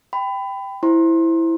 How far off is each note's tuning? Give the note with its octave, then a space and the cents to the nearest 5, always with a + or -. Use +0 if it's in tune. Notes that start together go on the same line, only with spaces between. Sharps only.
G5 +0 B5 +25
E4 +0 C5 +0 C6 +30